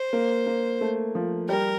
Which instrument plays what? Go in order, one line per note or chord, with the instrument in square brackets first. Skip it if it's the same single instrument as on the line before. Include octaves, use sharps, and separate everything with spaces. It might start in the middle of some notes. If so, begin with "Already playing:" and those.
Already playing: [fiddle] C5
[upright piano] A#3
A#3
A3
F3
[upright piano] G3 [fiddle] A#4